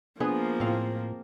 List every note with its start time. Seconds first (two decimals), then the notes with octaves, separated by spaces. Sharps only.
0.20 F3 A#3 B3 D4 G#4 B4
0.60 A2 C4 F5